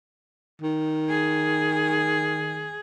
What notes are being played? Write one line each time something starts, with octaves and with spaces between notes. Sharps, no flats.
D#3
G#4